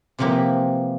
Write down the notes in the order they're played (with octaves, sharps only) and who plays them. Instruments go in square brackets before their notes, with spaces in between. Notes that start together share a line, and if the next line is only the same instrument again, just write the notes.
[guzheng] C3 E3 F3 A#3 G4